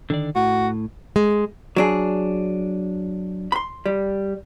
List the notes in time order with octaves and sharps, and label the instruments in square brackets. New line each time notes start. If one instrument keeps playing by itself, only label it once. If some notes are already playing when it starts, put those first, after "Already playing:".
[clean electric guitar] D3 D#3 D5
[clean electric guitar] A2 [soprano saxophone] F#4
[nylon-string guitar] G#3
[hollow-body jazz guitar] F#3 D4 G#4
B5 C6
G3